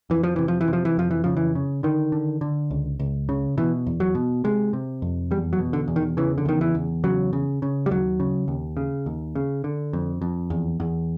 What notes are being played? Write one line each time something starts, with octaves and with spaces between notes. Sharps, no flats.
F2 E3
F3
C3 E3
F3
E3
C3
F3
E3
F2 F3
E3
C#3 F3
E3
C#3
D3 D#3
D3
D3
C#2
C#2
C#3
B2 E3
E2
F#3
B2
C3 G#3
C3
F2
E2 G3
F#3
B2
D3
E2
D#3
C#3 E3
D3
E2 D#3
E3
E2
C#3 F#3
C#3
C#3
G3
D#2 F#3
C#3
D#2
C#3
D#2
C#3
D3
F2
F2
E2
E2